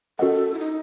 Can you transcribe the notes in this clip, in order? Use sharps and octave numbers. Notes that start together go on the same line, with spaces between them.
C#4 F#4 A4 A#4 D#5 F#5
E4
D#4